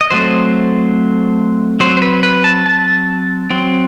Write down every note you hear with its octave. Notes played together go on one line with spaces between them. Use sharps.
D#5
F#3 A3 C4 C5
F#3 C4 C5
C5
B4
B4
A5
A5
F#3 C4